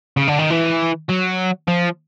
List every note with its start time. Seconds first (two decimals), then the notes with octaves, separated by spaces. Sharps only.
0.17 C#3
0.28 D3
0.39 D#3
0.50 E3
1.10 F#3
1.68 F3